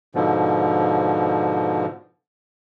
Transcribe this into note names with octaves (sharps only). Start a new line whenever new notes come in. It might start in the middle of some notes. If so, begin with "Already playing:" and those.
G#2 B2 D3 F3